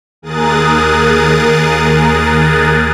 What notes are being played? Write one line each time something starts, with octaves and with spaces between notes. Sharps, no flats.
D#2 G#4 A#4 D#6 F#6 A6